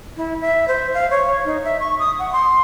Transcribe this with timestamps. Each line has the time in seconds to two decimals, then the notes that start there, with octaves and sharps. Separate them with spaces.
0.17 E4
0.41 E5
0.68 C5
0.94 F5
1.10 C#5
1.45 D#4
1.64 E5
1.80 C#6
1.99 D#6
2.19 F#5
2.33 C6